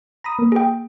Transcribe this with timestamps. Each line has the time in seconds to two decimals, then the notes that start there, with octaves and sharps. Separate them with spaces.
0.24 A#5 B5 D#6
0.39 A#3
0.52 G#4 G5